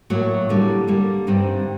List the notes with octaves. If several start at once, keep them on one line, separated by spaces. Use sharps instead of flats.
A2 F#3 A#3
D3 G3 A#3
D3 G3 A#3
G2 D3 G3 C4 D#4